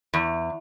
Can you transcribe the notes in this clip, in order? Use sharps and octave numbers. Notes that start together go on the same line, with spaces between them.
E2